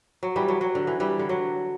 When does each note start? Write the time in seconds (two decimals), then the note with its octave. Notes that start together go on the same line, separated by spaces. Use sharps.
0.23 F#3
0.36 E3 G3
0.48 F#3
0.61 F#3
0.75 D3
0.87 E3
1.00 E3 G3
1.19 D3
1.29 F#3